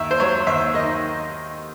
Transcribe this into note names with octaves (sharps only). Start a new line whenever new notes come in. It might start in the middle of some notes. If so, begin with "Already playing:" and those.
Already playing: D#2 E5
C5
F#3 C#5
D#2 E5
D#3 D#5